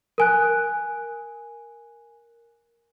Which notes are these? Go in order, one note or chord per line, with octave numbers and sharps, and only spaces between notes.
A#4 G#5 F#6